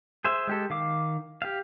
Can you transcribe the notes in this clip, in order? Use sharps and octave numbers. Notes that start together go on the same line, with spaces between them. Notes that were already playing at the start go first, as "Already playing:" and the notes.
G#4 C5 E5
G#3 G4 A4
D#3 F5 D6
G4 F5